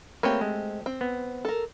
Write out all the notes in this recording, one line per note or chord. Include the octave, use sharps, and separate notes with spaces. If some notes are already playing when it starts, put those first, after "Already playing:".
A3 A#3 C4 G4 B4 C#5
G#3
C4
B3
A4 A#4